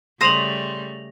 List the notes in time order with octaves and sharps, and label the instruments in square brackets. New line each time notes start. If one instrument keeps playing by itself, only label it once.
[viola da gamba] C#3 G3 A3 [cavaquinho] C5 D#6 [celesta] A#6 F7 F#7